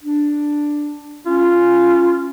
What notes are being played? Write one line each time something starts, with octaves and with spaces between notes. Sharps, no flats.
D4
C#4 F4